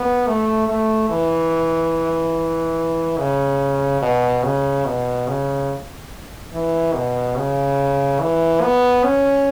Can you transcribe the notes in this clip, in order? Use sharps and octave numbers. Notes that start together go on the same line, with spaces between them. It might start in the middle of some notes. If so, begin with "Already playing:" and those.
Already playing: B3
A3
A3
E3
C#3
B2
C#3
B2
C#3
E3
B2
C#3
E3
B3
C#4